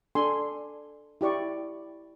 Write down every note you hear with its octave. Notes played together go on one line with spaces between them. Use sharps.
D4 A4 G#5 C6
E4 G4 D5 C#6